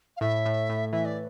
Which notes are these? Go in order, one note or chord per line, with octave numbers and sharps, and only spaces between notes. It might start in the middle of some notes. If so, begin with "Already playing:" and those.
F5
A2 E5
A2
A2
E3 E5
D5